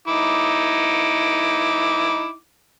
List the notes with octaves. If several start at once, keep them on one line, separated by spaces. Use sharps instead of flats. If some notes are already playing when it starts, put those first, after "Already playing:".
D#4 E4 D6